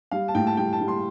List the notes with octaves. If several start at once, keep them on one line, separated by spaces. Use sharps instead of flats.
G3 F5
A5
A2 G5
A5
G3 G5
A5
G3
C6